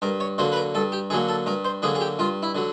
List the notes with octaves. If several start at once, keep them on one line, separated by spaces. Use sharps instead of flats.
G2 A#4
C#5
D3 F#3 A#3 C5
B4
A#4
G2 A4
G4
D3 F#3 A#3 G#4
A4
G2 A#4
C5
D3 F#3 A#3 G#4
G#4
G4
G2 F4
E4
D3 F#3